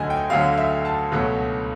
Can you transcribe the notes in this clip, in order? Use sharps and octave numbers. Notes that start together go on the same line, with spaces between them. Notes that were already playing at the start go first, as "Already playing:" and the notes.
Already playing: D2 D3 F#3 A3 D#5 G#5
G5
D2 D3 F#3 A3 F5
E5
A5
C#2 B2 F#3 A3